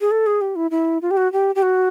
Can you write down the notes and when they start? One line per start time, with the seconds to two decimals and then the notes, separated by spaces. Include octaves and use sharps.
0.01 G#4
0.11 A4
0.26 G#4
0.41 G4
0.56 E4
0.71 E4
1.02 F4
1.11 G4
1.17 F#4
1.33 G4
1.55 G4
1.62 F#4